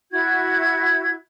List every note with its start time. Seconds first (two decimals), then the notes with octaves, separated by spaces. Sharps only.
0.11 E4 F#4 G#6